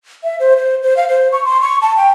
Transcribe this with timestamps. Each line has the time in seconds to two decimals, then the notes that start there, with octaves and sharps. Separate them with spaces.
0.24 E5
0.40 C5
0.57 C5
0.82 C5
0.97 F5
1.09 C5
1.32 C#6
1.45 C6
1.61 C#6
1.82 A5
1.97 G5